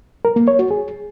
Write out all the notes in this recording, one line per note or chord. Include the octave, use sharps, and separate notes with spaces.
A#4
A#3
C#5
F#4
G#4